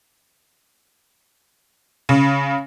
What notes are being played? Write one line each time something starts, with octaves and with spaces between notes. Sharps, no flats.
C#3